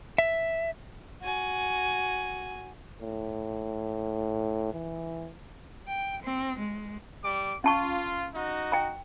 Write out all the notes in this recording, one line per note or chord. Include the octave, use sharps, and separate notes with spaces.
E5
F#4 G#5
A2
E3
G5
C4
G#3
G3 D6
C#4 F4 A5 C#6
D#4 F#4
G5 A#5